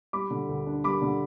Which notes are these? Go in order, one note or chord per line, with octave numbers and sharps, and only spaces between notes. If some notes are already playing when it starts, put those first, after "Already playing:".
G3 B5 D6
D3
D2
D4
G3 B5 D6
D3